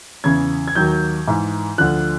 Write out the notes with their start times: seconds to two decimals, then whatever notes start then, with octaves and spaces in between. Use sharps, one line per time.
0.24 E2 C#3 E3 G#6
0.68 G#6
0.75 D#2 D#3 F#3 G6
1.27 G#2 E3
1.78 D2 D3 F3 F#6